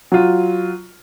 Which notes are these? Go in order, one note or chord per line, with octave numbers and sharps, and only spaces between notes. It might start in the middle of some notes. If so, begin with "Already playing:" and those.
F#3 F4